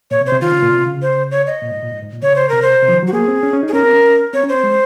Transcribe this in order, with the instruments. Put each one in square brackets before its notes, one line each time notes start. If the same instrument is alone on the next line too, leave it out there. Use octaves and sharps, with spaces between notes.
[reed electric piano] A#2 [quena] C#5
[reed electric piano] C3
[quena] C5
[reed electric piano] C3
[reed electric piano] D#3 [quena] F4
[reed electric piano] C#3
A#2
C3
C#3
[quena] C5
C#5
D#5
[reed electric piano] A#2
G#2
A#2
G#2
G#2
A#2
[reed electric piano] C#3 [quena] C#5
[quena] C5
[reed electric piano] C3 [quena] A#4
[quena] C5
[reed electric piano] C3
F3
D#3
F#3
[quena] F#4
[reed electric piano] A#3 [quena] G#4
[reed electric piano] C4
C#4
C#4
D#4
[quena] G#4
[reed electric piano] C#4 [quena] A#4
[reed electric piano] C4
C#4
[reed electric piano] C4 [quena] C#5
[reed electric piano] C#4
[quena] C5
[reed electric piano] C4
G#3